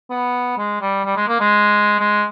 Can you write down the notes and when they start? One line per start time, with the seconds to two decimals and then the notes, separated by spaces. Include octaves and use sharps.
0.10 B3
0.58 G#3
0.81 G3
1.05 G3
1.16 G#3
1.28 A#3
1.40 G#3
1.99 G#3